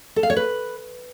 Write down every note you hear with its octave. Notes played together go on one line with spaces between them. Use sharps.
A4
F5
C#5
B4